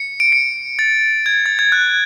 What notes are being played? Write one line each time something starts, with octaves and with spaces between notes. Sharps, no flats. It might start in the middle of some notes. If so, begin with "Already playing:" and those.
Already playing: C#7
D7
C#7
A6
G#6
A6
G#6
F#6